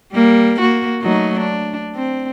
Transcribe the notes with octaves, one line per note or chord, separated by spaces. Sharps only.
G3 A#3
A#3 F#4
F#3 A3 D#4
D4
C4